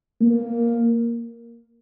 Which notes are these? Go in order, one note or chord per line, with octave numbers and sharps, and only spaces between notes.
A#3